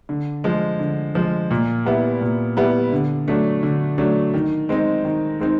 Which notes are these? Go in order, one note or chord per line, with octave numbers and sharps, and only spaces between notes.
D3
F3 G#3
D3
F3 G#3
A#2
G3 B3 E4
A#2
G3 B3 E4
D3
F#3 A3 D4
D3
F#3 A3 D4
D#3
G#3 C4 D#4
D#3
G#3 C4 D#4